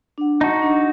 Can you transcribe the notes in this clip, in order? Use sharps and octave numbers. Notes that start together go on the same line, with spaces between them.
D4 F#5
D#4 F#4 A5
D4